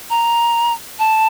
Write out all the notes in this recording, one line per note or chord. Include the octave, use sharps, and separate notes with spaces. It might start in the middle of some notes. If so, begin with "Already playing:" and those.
A#5
A5